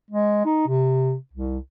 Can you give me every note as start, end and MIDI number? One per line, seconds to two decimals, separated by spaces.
0.11 0.41 56
0.46 0.64 63
0.68 1.16 48
1.33 1.59 36